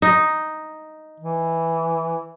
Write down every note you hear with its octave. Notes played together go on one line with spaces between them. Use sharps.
D#4
E3